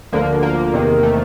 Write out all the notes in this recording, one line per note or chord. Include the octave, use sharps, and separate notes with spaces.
D2 D3 F3 A#3
A#3
E2 C3 D#3
A3